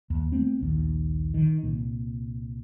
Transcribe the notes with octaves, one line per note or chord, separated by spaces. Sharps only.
D#2
A3 B3 C4
A#1 D#2
D#3
C2 A#2